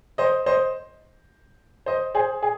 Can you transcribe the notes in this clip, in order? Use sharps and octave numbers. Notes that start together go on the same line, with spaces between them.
C5 D#5
C5 D#5
C5 D#5
G#4 C5
G#4